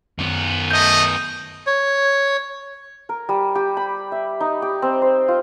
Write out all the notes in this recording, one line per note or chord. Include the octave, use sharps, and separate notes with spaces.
F#2 B3
A3 D#5 G6
C#5
A#4
G3
G4
B5
E5
D#4
G4
C4
C5
F4